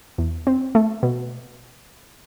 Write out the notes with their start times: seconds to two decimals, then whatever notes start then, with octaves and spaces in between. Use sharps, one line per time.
0.18 E2
0.47 C4
0.75 A3
1.03 B2